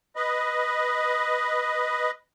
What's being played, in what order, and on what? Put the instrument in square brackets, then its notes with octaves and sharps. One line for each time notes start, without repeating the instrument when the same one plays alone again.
[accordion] B4 D#5